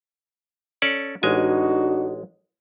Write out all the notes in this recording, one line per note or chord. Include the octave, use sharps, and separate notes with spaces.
C#4 A4 D5
A1 G#3 D4 D#4 F#4 G#5